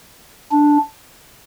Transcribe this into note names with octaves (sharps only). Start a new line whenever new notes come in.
D4